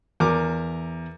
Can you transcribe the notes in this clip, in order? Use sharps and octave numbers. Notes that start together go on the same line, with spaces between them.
E2 A#4 D6